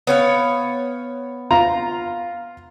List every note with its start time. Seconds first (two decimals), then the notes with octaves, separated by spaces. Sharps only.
0.07 B3 C#5 F5
1.51 F4 A#5